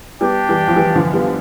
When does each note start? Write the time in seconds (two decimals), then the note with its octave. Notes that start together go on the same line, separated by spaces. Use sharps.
0.21 G3 B3 D4 G4 D5 G5
0.49 E3 G3
0.68 F3
0.76 E3 G3
0.95 D3 F3
1.14 G3 B3